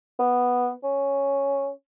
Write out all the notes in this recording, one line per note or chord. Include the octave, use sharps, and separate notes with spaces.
B3
C#4